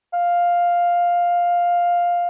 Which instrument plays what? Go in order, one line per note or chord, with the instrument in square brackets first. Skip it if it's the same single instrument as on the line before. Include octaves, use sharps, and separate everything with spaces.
[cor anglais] F5